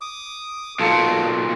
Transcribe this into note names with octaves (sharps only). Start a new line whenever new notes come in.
D6 D#6
B1 A#2 F4 A4